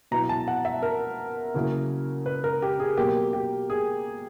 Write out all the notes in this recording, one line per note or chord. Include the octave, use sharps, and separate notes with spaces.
B2 F#3 B3 E4 A#5
A5
F#5
E5
A#4
C#3 F#3 A#3 C#4 E4
B4
A#4
G4
G#4
B2 F#3 A#3 G4
G4
G#4